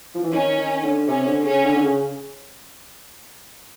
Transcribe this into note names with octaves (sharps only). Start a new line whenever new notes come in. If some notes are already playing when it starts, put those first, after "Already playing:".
F3
E3
D#3 C#4
D#3
D3
C3 C#4
D3
C#3 C#4
D3
D3
C#3